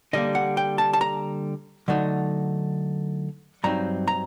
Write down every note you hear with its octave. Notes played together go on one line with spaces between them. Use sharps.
D3 G3 A#3 D#5
F#5
G5
A5
A5
A#5
D3 F#3 A3 D#4
G2 F#3 C4 D#4 A#5
A#5